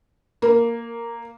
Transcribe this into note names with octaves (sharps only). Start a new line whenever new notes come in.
A#3